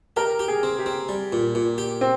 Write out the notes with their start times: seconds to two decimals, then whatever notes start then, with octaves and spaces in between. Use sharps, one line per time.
0.17 G4 A#4
0.39 G4
0.48 G#4
0.63 C4
0.79 G4
0.86 C4
1.09 G3
1.32 A#2
1.55 A#2
1.78 G4
2.01 C4